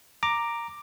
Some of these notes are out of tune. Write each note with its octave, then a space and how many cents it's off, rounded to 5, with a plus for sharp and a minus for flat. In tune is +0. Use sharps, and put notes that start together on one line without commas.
A#5 +0 D6 +10